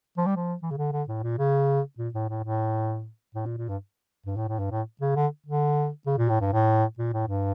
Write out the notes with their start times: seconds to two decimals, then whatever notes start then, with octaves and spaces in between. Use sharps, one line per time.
0.17 F3
0.26 G3
0.36 F3
0.63 E3
0.71 C#3
0.77 D3
0.92 D3
1.08 A2
1.23 A#2
1.38 C#3
1.98 A#2
2.14 A2
2.29 A2
2.45 A2
3.35 A2
3.46 A#2
3.57 A#2
3.69 G2
4.26 G2
4.37 A2
4.48 A2
4.59 G2
4.71 A2
5.01 C#3
5.16 D3
5.46 D3
6.06 C#3
6.18 A#2
6.29 A2
6.41 G2
6.53 A2
6.98 A#2
7.13 A2
7.28 G2